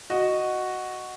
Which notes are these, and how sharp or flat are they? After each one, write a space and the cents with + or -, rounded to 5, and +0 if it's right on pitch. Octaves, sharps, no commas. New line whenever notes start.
F#4 +0 D#5 -10